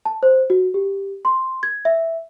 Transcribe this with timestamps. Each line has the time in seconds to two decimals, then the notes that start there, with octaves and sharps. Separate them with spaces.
0.05 A5
0.23 C5
0.50 F#4
0.74 G4
1.25 C6
1.63 G#6
1.85 E5